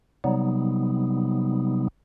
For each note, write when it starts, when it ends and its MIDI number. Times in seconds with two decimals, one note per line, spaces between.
0.24 1.88 48
0.24 1.88 54
0.24 1.88 55
0.24 1.88 59
0.24 1.88 63